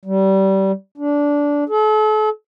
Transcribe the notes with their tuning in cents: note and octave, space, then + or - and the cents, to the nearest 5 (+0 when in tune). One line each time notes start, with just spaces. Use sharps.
G3 -25
D4 -15
A4 -40